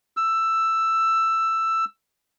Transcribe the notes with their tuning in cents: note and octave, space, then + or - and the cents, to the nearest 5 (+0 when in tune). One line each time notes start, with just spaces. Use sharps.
E6 +10